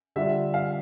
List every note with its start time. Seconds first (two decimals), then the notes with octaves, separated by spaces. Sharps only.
0.16 D3 G3 D4 F4 E5
0.54 F5